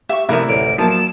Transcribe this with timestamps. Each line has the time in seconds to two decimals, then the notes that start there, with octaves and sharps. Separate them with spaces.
0.09 G4 E5 C#6
0.29 C3 E3 F3 A3 E4 A#4 D5
0.49 A1 D2 D7
0.78 F3 F#3 A#3 A5
0.91 E7